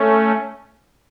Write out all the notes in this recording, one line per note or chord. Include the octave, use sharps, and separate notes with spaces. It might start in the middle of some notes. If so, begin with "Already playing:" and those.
Already playing: A3 C#4